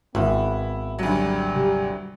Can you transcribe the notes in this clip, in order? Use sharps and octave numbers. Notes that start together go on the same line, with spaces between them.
G#1 B3 E4
D2 F#3 G3
C3 G4